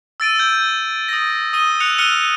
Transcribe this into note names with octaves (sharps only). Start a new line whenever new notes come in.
E6 A6 D7 D#7
G6
D#6 A#6
D#6 D#7 G7
E6 F#6 C#7 F7
F6 F#6 C#7 D#7 G7